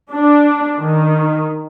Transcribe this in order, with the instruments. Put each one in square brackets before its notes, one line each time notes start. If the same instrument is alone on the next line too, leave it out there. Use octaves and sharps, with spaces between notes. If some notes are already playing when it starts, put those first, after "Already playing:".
[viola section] D4
D#3